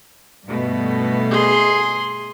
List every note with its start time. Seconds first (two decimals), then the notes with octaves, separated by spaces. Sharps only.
0.47 G2 B2 A3
1.31 G#4 C6